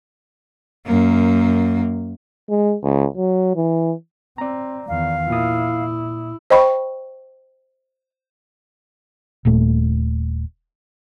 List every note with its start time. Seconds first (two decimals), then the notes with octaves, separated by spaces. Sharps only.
0.86 F#2 A#3
2.50 G#3
2.83 C#2
3.17 F#3
3.56 E3
4.38 C4 D5 A#5
4.88 E2 D#3 F5
5.30 A#2 E4 D#6
6.50 C5 D#5 G5 B5 C#6
9.45 D#1 A#2 A3